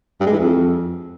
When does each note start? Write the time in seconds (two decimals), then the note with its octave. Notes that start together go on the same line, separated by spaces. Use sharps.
0.21 G2
0.27 G#3
0.33 E3
0.39 F2